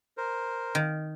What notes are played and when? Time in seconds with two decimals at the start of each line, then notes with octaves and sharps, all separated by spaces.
0.17 A#4 C5
0.75 D#3